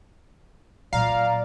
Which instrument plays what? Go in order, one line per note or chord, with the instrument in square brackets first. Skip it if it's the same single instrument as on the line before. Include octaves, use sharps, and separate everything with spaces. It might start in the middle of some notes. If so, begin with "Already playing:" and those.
[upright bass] A#2 F#3 [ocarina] D5 [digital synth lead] F5 [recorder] A#5